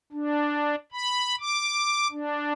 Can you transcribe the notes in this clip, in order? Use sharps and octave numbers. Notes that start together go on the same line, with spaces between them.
D4
B5
D6
D4